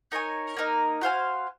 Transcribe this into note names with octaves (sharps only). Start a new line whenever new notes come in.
D#4 A#4 C#5 G#5
A#3 D#4 A#4
F#4 C5 F5 G#5